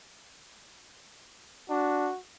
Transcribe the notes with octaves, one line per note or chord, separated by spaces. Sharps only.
D4 F#4